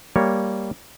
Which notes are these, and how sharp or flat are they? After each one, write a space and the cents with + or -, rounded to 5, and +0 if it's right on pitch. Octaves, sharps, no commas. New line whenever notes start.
G3 +0 A#3 +0 C#5 +0